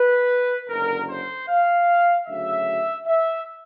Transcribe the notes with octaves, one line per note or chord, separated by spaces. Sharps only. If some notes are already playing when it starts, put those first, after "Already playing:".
Already playing: B4
F#1 F#2 D3 A#4
C5
F5
D2 C#3 F#3 E5
E5